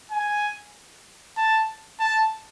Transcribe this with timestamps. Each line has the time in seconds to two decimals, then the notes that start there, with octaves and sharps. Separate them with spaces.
0.11 G#5
1.37 A5
2.00 A5